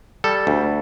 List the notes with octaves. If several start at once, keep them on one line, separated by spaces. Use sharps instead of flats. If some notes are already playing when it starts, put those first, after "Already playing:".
G3 A4
D2